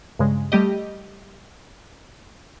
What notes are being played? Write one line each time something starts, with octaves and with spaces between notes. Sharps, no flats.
G2 C#3 G#3
G3 A3 G4 D#5